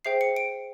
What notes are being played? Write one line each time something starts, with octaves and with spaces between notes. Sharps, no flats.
G#4 C5 E5 G5 C7
C#7
D7